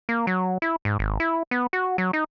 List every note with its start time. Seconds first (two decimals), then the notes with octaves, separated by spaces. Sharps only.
0.09 A#3
0.27 F#3
0.62 E4
0.85 G#2
0.99 G#1
1.20 E4
1.51 B3
1.73 F#4
1.98 F#3
2.13 D#4